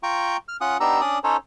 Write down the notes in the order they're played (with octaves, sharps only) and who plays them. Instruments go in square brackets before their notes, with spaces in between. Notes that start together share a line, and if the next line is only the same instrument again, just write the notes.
[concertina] F4 G5 A#5 C#6
F6
C#4 F4 F#5 D#6
B3 D4 D#4 G4 A#5 E6
C#4 D4 D5 D#6
C#4 D#4 A4 C5 C#5